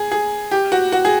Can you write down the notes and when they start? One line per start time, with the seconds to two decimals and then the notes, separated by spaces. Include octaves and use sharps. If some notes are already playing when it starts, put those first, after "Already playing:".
Already playing: G#4
0.12 G#4
0.51 G4
0.72 F#4
0.92 F#4
1.05 G#4